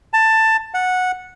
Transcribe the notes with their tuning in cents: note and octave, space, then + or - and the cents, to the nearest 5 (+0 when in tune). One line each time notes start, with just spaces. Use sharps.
A5 +15
F#5 -10